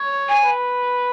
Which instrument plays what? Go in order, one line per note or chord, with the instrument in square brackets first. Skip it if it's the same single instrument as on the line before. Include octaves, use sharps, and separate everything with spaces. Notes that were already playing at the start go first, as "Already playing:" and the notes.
Already playing: [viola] C#5
[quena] G#5
[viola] B4